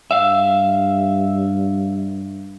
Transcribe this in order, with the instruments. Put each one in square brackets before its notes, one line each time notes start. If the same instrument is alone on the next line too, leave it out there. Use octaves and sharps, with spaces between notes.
[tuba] G2 [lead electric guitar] E5 F5